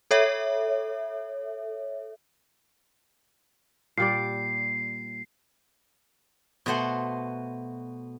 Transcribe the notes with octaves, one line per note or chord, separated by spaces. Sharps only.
A4 C#5 E5
A#2 G3 D5 C7
B2 A3 F#4 C5 F#5 C6